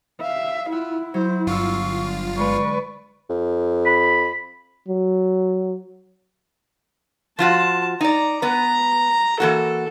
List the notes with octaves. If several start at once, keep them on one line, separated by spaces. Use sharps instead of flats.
E5 F5
E4 F4 E5 F#5
F#3 C5
G1 B3 F4 C#6 E6
D3 G#3 B4 D5 C#6
F2
B5
F#3
F3 F4 F#4 A5
D#4 D5 A#5
B3 B4 A#5
E3 A#3 F#4 A4